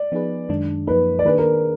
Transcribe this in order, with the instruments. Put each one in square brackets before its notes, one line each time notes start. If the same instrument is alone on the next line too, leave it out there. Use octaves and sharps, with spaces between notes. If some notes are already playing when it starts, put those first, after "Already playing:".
Already playing: [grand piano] D5
[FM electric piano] F3 B3 D#4 G#4 B4
F#2 D#3 G#3 D4
[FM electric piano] F#2 F3 A#3 D#4 [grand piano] B4
[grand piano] D5
[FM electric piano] D#3 A#3 D4 G#4 [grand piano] B4
[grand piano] A#4